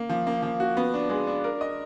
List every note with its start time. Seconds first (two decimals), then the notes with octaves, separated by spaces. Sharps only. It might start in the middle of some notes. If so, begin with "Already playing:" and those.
Already playing: A#3
0.09 F3
0.27 A#3
0.43 F3
0.60 F#4
0.77 B3
0.94 D4
1.09 G#3
1.27 D4
1.44 A#4
1.61 D#5